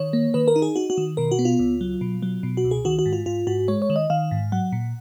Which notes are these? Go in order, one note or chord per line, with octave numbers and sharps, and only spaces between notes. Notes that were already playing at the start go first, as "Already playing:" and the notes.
Already playing: D#3 C#5
A#3
D#3 B4
A#4
D#4
G#4
D#4 F#4
F#4
D#3
B2 A#4
F#4
B3
F4
C#2
F#3
B2
F#3
B2
F#4
C#2
G#4
D#3 F#4
F#4
G#2
F4
G#2 F4
G#2 F#4
G#3 C#5
C#5
D#3
D#5
D#3 F5
G#2
F#3 F#5
A#2